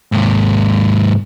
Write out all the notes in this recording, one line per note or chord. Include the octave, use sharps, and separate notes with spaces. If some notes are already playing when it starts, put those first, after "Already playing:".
D#2 G#2